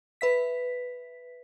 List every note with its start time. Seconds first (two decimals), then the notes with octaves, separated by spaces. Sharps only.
0.21 B4 E5 B6